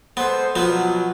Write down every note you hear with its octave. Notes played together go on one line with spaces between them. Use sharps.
G#3 B3 A4 C5
B2 F3 F#3 B3